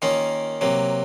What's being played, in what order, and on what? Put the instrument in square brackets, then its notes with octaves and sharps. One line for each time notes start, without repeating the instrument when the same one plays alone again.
[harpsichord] D#3 A#3 C#4 F4
C3 F#3 A#3